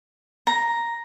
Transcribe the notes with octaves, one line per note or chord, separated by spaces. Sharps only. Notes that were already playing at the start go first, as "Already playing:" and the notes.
A#5